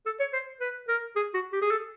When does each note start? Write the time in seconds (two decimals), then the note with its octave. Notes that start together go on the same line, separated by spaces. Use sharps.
0.06 A4
0.20 C#5
0.33 C5
0.60 B4
0.88 A#4
1.16 G#4
1.34 F#4
1.52 G4
1.61 G#4
1.71 A4